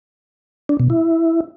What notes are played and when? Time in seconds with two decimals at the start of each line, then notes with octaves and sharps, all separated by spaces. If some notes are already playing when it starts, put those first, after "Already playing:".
0.69 D4
0.80 B2
0.90 E4